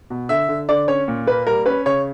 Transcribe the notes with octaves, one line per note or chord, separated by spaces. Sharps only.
B2
D3 E5
D3
D3 D5
C#4 C#5
A#2
A#3 B4
G3 A#4
C#4 B4
C#3 C#5